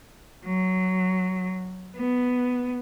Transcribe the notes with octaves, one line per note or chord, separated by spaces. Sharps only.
F#3
B3